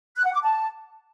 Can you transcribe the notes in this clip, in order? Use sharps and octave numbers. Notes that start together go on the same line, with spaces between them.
F#6
F#5
D6
A5